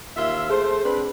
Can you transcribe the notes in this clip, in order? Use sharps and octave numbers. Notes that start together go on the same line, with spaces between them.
D#2 F4 E5
A3 G#4 C5
C4 D4 B4